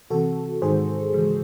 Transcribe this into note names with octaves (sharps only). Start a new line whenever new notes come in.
C3 E3 C4 F#4 A4
G#2 D#3 G#3 D#4 G#4 C5
C#3 E3 G#3